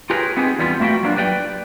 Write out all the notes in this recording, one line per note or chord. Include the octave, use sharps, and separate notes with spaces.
F4 G4 G#4 A#4 B4 C#5
B3 C4 D#4 G4 G#4
E2 G3 B3 F4
A3 A#3 F#4 B4 G5
F#3 A#3 C4 D4 F4
G4 B4 D5 F#5 G5